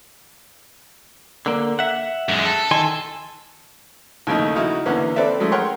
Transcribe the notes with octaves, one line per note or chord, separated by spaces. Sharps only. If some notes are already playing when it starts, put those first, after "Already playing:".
D3 A#3
E5 F#5
F#2 G#3
A4
D#3 G#5 C6
D#2 C#3 A3 D#4
C#3 D#4 E4 F#4
E2 D3 A#3 B3 C#4
C4 A4 B4 C5 D5 E5
F#3 G#3 A3 C#4
A#4 C#5 F#5 G5 C6